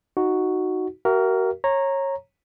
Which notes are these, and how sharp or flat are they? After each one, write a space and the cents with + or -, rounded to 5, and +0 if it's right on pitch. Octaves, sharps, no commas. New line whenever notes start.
D#4 +0 F#4 +0
F#4 +40 A#4 +0 E5 +40
C#5 -20 A#5 -5